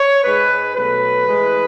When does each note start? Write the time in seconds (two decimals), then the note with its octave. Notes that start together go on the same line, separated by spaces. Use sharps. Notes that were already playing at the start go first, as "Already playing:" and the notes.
Already playing: C#5
0.24 G#2 G#3 B4
0.75 B2 F#3 A3 B4
1.26 A2 E3 G#3